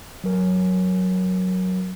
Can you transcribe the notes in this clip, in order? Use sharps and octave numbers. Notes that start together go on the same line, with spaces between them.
F#3 A#4